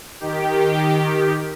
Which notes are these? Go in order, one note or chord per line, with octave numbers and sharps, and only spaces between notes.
D#3 G4